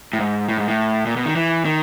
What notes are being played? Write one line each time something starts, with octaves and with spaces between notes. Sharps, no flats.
A2
G#2
A2
G#2
A2
A#2
B2
D#3
E3
D#3